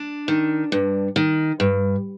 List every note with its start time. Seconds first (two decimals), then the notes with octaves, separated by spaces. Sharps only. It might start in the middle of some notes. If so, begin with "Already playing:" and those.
Already playing: D4
0.28 D#3
0.72 G2
1.16 D#3
1.60 G2